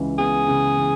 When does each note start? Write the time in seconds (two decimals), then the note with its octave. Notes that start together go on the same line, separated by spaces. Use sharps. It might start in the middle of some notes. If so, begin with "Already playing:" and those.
Already playing: C#2 C#3 E3
0.19 B3 G#4
0.48 C#3
0.77 E3